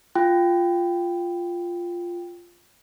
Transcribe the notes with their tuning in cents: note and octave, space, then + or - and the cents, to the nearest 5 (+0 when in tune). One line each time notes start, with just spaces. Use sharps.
F4 +0 G5 +0